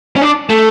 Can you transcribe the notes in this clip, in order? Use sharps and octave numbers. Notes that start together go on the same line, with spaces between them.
C#4
D4
A3